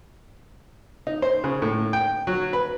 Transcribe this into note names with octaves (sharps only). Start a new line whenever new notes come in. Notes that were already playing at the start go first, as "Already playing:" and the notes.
D#4
C5
C#3
A2
G5
F#3
B4